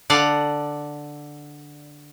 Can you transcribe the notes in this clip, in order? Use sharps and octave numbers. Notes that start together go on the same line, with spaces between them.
D3 D5 F5 F#5